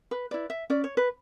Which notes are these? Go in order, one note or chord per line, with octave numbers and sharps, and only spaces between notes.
B4
E4 B4 D5
E5
C#4 D5
C#5
B4